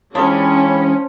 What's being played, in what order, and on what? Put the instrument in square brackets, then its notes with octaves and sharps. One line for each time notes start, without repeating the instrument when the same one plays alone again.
[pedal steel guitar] E3 G#3 D4 [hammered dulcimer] F3 [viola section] C#4 [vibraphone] G5 G#5 B5